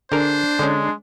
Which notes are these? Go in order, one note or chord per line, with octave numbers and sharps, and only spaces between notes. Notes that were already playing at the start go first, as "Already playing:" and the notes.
D3 D4 G#4 A#4 C5
D3 G#3 C#4